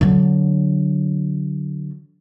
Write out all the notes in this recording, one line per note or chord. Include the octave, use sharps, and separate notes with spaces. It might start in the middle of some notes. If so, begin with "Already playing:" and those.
D3 F#3